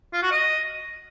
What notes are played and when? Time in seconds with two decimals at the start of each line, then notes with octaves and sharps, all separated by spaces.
0.13 F4
0.22 F#4
0.32 D#5